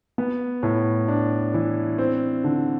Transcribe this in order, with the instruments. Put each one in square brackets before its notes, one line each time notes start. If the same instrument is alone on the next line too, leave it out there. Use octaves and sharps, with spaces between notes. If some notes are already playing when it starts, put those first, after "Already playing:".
[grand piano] B3
A2
D4
E3
C4
D3